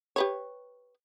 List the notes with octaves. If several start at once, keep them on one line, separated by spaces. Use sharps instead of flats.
G4 B4 C#5